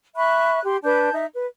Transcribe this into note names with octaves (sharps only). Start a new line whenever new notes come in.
E5 B5 C#6 F#6
G4 C6
D4 B4 A5 G6
D#4 E5
B4